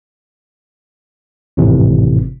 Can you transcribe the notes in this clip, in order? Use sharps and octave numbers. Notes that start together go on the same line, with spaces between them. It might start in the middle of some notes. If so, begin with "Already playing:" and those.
G#1 F2 A2 C3 E3